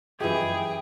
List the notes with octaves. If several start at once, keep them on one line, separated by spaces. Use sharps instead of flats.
F#2 E3 F3 G#3 G4 G#4 G5